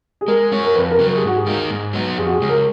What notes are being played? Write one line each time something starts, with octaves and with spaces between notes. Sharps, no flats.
G#4
G#3 A#4
C#4 F#4 C#5
A#4
F2 B4
A#4
C#3 F#3
A#4
G#4
G#2 F#4
G#4
D#3 A#3 D#4
G#2
F#3 B3 D#4
F2 G#4
F#4
G#4
C#3 G#3
A#4